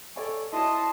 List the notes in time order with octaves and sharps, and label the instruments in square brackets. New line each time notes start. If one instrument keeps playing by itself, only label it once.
[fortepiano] A4 D5 G#5 [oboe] C#5
[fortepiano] E4 F#4 C#5 [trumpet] D#5 [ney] A5 [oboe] C6